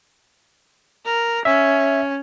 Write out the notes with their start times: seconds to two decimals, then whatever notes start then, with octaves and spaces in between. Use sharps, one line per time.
1.05 A#4
1.45 C#4 E5